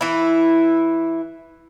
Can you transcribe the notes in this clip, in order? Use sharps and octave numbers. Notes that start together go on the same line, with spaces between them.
E3 E4